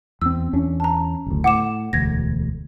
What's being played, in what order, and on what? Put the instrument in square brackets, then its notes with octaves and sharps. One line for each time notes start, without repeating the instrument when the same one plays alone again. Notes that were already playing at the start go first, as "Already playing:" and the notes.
[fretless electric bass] E2 C4 [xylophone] E6
[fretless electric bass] E2 C#4 D4
[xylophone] A5 A#5
[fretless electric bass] F#1 D2
[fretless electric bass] A2 [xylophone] F#5 D6 E7
[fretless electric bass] E1 D2 [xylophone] G#6 A#6